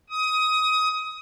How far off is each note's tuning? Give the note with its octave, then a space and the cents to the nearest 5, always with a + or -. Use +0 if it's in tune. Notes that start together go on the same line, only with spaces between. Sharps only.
D#6 +20